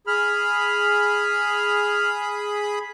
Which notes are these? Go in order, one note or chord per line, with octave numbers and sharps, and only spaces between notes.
G#4 B5 F6